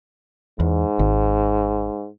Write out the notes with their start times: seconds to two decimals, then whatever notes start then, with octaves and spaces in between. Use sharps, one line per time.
0.60 E2 G#2
0.99 G#1